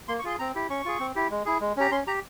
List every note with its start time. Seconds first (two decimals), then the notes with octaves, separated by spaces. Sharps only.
0.08 A#3 C6
0.19 C#6
0.24 F4 G#4 C6
0.39 C4 A#5
0.55 E4 G4
0.69 C#4 C#6
0.85 F4 G#4
1.00 C4
1.16 E4 G4
1.31 G#3
1.45 E4 G#4
1.61 G#3
1.77 C#4 G4 A#5
1.91 C#4 C6
2.07 G4 A#5